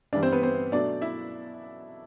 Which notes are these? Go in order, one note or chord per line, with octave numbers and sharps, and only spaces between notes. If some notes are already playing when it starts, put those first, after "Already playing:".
G2 E3 G3 D4 D5
C4 C5
B3 B4
C4 C5
B2 F#3 A3 D4 D5
E4 E5